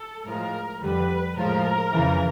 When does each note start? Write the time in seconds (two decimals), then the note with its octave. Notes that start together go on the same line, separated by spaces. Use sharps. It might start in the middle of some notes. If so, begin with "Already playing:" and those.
Already playing: A4
0.26 A2 F3 G#3 A#4
0.81 F2 D3 G3 B4
1.37 A2 F3 G#3 A#4
1.92 F2 C#3 E3